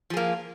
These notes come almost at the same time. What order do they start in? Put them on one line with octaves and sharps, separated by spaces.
F3 G#4 A#3